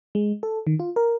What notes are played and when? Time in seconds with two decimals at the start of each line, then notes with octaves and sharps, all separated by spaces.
0.15 G#3
0.43 A4
0.67 D#3
0.79 F4
0.96 A#4